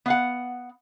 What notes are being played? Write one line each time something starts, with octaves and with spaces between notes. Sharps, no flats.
B3 F5 F#5